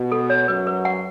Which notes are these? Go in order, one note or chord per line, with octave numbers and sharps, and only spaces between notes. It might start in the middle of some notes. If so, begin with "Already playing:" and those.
Already playing: B2
A4
C#5
F#2 F#3 B4
B4
F#5